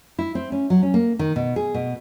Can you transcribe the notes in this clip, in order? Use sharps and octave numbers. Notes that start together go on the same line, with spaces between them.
E4
C4
C#4
F#3
C#4
A#3
D#3
B2
G#4
B2